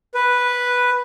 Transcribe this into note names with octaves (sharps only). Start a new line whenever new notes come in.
B4